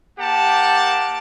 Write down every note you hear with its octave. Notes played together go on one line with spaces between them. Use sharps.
A#3 G4 F#5 A5